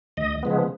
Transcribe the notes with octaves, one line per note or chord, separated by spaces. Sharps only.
D2 D#5
C#3 F3 G#3 B3